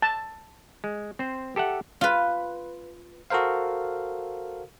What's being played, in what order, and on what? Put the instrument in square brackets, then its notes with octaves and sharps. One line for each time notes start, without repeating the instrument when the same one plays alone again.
[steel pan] A5
[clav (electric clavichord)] G#3
C4 C5
G4 A4 E5 F#5
[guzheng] F4 B4
[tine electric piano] F#4 A4 A#4 C5 F5